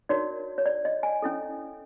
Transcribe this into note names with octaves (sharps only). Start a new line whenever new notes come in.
D#4 F#4 A#4 C#5 D5
C#5
D5
D#5
G#5
C#4 E4 A4